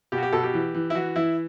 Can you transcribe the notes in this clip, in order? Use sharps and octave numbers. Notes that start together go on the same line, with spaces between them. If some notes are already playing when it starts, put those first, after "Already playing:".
B2 G4
F#4
G4
B2 A4
G4
E3
E3
E4
E3 F#4
E3 E4